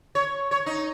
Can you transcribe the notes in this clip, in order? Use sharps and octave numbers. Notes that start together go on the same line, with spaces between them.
C#5
C#5
D#4